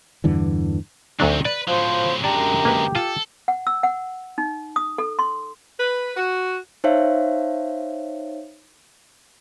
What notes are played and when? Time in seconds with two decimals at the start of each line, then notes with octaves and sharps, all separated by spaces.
0.24 E2 G2 D3 E3
1.20 D2 D#3 F#3 C4 D4
1.45 B4 D5
1.68 A2 F3 F#3 C5
2.24 F#2 D3 G#3 G4 D5 A5 A#5
2.65 A#3 G4 B4
2.95 F4 A4
3.48 F#5
3.67 E6
3.83 F#5
4.38 D#4
4.76 D#6
4.98 A4
5.19 C6
5.78 B4
6.15 F#4
6.84 D#4 C5 C#5 E5 F5